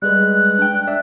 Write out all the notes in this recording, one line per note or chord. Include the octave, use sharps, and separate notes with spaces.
G3 G#3 B4 F#6
D4 G5
D5 E5